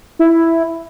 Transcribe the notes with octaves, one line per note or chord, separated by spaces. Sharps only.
E4